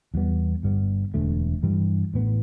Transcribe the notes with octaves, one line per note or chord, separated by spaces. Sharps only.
E2 E3 G3 B3
G1 G2 G3 B3
E1 D2 D3 A3
G2 E3 G3
A1 A2 E3 B3